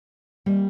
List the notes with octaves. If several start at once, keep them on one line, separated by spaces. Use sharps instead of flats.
G3 A#3